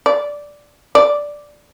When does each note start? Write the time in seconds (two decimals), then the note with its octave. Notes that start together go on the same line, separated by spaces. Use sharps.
0.06 D5
0.95 D5